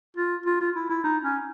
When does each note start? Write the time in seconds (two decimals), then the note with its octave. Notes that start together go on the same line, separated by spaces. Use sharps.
0.17 F4
0.46 F4
0.60 F4
0.76 E4
0.89 E4
1.04 D#4
1.23 C#4